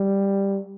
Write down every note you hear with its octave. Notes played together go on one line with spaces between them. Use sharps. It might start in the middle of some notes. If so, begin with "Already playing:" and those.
Already playing: G3